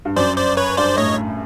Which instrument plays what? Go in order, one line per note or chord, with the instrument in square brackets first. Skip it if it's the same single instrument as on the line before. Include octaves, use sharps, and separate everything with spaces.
[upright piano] G2
[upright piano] F#2 [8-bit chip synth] C5 D5
[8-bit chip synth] C5 D5
B4 C#5
[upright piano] G2 [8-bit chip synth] C5 D5
[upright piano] A2 [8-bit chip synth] C#5 D#5